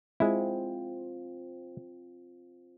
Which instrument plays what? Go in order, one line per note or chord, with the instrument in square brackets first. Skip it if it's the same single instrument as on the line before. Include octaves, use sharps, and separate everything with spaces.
[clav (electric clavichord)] G#3 E4 [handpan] C4 F4